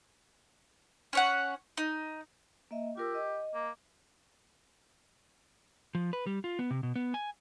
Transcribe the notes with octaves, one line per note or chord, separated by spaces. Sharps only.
C#4 C#5 F#5
D#4
A#3 D#5 E5
F4 G4 A#4 E6
D#5
A#3
F3
B4
G3
F4
B3
C3
B2
B3
G#5